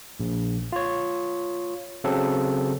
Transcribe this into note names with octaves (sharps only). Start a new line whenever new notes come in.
A#1
F4 C#5
C#3 F#3 C4 A4